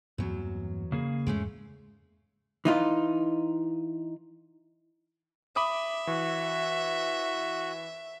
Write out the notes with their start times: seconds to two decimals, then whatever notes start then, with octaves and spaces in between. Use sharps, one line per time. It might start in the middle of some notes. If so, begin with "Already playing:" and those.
0.18 E2 G2 F#3 A#3 C4
0.92 C#3 A#3 G#4
1.27 E2 G#2 G#3 A3 C#4
2.65 E3 D#4 F4
5.56 E5 B5 D6 D#6
6.07 E3 F#4